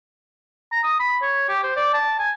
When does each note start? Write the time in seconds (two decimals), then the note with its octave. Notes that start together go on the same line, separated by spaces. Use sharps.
0.72 A#5
0.84 D#6
1.00 B5
1.22 C#5
1.49 G4
1.63 C5
1.76 D5
1.94 A5
2.19 G#5